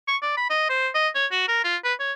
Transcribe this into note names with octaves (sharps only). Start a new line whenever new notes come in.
C#6
D5
B5
D#5
C5
D#5
C#5
F#4
A#4
F4
B4
C#5